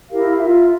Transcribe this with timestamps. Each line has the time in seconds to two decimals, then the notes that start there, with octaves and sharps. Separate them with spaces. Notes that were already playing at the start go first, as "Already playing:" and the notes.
0.09 E4 G4 A#4 F5
0.37 F4 A#4 E5